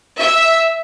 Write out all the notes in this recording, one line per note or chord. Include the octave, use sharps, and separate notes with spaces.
E5